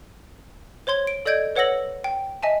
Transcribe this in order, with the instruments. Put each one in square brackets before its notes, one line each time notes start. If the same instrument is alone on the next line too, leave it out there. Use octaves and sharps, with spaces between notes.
[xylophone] C5 C#5 C6 G#6
D7
A4 D5 D#5 G6 G#6 D7
B4 C#5 F#5 E6 A#6 F#7
G5
D#5 E5 G#5 A5